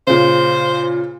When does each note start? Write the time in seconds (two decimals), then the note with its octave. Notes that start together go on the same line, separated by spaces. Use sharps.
0.07 A#2 C#3 C5